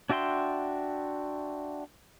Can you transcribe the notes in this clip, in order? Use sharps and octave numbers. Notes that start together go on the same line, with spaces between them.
D4 F#4 E5 G5 C6